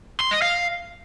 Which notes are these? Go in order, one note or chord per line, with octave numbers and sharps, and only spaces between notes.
C6
D#5
F5